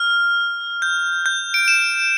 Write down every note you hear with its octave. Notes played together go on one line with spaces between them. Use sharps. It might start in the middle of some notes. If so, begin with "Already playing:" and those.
Already playing: F6
G6
G6
D7
E7